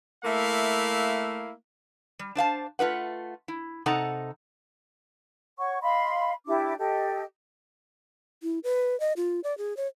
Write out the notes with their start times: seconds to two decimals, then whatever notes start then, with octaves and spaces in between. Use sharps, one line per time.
0.24 A3 A#3 E4 F5
2.19 G3
2.35 D4 C5 F5 A5
2.79 A3 F4 B4 F#5
3.48 E4
3.86 C3 D#4 A4 F#5 A#5
5.58 C#5 F#5 C#6
5.82 D#5 F5 B5 C6
6.47 D4 E4 G4 D6
6.79 G4 A4 D#5
8.43 E4
8.64 B4
9.00 D#5
9.17 F4
9.44 D5
9.58 G#4
9.77 C#5